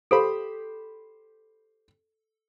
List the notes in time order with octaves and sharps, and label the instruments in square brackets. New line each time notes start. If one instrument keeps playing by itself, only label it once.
[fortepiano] G4 C5 B5 [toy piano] A4